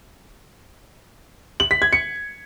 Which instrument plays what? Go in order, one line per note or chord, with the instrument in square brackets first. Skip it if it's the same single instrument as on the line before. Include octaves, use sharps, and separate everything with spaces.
[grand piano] F#7
B6
G#6
C#7